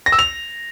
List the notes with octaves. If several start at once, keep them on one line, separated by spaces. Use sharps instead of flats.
A#6
E6
F7